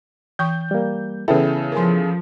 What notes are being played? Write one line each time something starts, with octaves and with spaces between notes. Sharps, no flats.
E3 G5 C#6 G6
G3 A#3
C#3 E3 B3 E4 A4 B4 G5
F3 A#4 G#5 C6